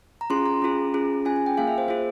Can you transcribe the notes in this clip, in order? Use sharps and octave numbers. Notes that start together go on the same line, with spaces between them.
A#5
C#4 F4 G#4 C6
A#5
C#4 F4 G#4
C#4 F4 G#4
C#4 F4 G#4 G#5
G#5
G5
A#3 F4 G#4 F5
E5
C5
A#3 F4 G#4 C5